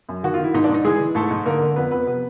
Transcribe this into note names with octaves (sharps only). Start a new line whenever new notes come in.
F#2
D#3 F#4
F4
D#3
E4
G#2 D#4
D4
G#2
D#4
E3 G#3 G#4
E3
G#2 A3 A4
G#2
D3 A#3 A#4
D3
F2 B3 B4
F2 B3 B4
C3 B3 B4